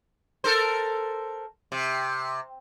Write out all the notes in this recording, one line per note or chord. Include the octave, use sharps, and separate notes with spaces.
A4 A#4 C5
C3